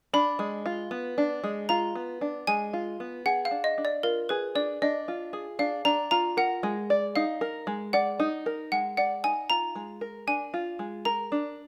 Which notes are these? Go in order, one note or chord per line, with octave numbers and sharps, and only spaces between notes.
D4 B5
G#3
F4
B3
D4
G#3
F4 A#5
B3
D4
G#3 G#5
F4
B3
G#4 F#5
F5
D4
D#5
D4
D5
F4 A#4
G#4 B4
D4 D5
D4 D#5
F4
G#4
D4 F5
D4 A#5
F4 A#5
A#4 F#5
G#3
D5
D#4 F5
A#4
G#3
D5 F#5
D#4
A#4
G#3 F#5
D5 F#5
D#4 G#5
F4 A#5
G#3
A#4
D4 G#5
F4
G#3
A#4 A#5
D4